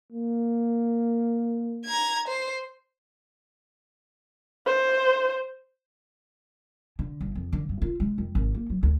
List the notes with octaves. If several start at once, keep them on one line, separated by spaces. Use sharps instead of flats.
A#3
A#5 G#6
C5
C5
D3
G1
F2
D3
G2
F4
G#3
F2
G#1
A#3
F#3
D2